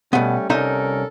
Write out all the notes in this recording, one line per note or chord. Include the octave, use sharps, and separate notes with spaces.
B2 G3 A3 B3 C#4
C2 C#4 D#4 A4 A#4 E5